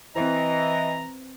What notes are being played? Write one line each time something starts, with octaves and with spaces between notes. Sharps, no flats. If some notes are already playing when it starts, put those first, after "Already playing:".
E3 C4 B4 C5 D#5 A#5